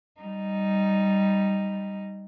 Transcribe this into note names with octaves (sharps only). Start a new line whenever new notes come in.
G3 D#4